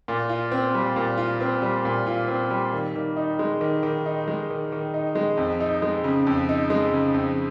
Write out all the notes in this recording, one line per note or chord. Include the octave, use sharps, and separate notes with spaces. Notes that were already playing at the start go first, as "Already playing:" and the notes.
A#2
F4
C4
G3
A#2
F4
C4
G3
A#2
F4
C4
G3
D#3
D#3
D#4
G#3
D#3
D#3
D#4
G#3
D#3
D#3
D#4
G#3
F2
D#4
G#3
C#3
F2
D#4
G#3
C#3
F2